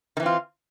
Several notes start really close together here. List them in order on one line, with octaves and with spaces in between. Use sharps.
D#3 E3 C4 F4